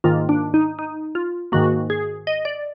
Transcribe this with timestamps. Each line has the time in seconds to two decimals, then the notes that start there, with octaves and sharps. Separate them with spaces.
0.04 G#2 D#3 A#3 F4
0.29 D4
0.54 D#4
0.79 D#4
1.15 F4
1.52 G#2 D#3 A#3 F#4
1.90 G#4
2.27 D#5
2.45 D5